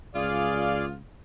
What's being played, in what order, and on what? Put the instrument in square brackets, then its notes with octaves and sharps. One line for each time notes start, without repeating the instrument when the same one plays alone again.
[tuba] C#2 [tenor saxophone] F4 [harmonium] G#4 D5 F5